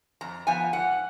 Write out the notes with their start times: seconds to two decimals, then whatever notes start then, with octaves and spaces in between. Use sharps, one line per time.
0.21 F2 A#5
0.47 F3 B3 G#5
0.73 G#2 F#5